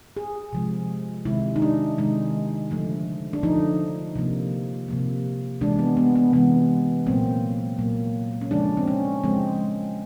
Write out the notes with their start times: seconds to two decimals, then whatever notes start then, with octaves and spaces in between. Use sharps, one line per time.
0.17 G#4
0.53 C3 F3 G#3
1.25 C3 D#3 G#3 E4
1.56 D#4
1.62 D4
1.98 C3 D#3 G#3 D#4
2.71 D3 F3 A3
3.33 D4
3.43 D3 F3 A3 D#4
4.16 C3 F3 A#3
4.89 C3 F3 A#3
5.61 C3 E3 G#3 D4
5.79 B3
5.97 B3
6.15 B3
6.33 C3 E3 G#3 B3
7.06 A#2 F#3 A#3 C4
7.78 A#2 F#3 A#3
8.41 C#4
8.51 C#3 F3 G#3 D4
8.77 C4
8.88 C#4
9.24 C#3 F3 G#3 C4